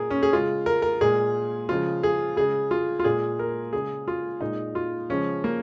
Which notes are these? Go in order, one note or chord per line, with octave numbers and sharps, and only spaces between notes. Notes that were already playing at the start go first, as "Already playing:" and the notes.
Already playing: A#2 G#3 G#4 A#4
C#4
G#4
C#3 G#3 F4
A#4
A#4
A#2 G#3 G#4
C#3 F3 G#3 F4
G#4
C#3 G#3 G#4
F4
F4
A#2 G#3 G#4
A#4
C#3 G#3 G#4
F4
A#2 G#3 D#4
F4
C#3 F3 G#3 C#4
A#3